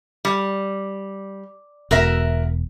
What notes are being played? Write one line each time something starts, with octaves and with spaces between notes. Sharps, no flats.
G3
E1 F#4 A#4 E5